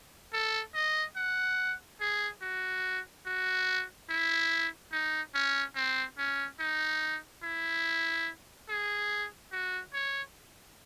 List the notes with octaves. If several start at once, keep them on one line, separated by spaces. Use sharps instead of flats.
A4
D#5
F#5
G#4
F#4
F#4
E4
D#4
C#4
C4
C#4
D#4
E4
G#4
F#4
C#5